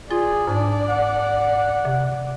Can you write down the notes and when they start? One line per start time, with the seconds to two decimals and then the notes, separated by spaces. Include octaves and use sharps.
0.11 F4 G#4 D5
0.47 G#2 D4
0.88 F#5
1.85 C3